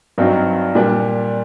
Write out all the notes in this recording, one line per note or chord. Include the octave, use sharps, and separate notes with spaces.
G2 F#3 C4 D#4
A#2 G3 D4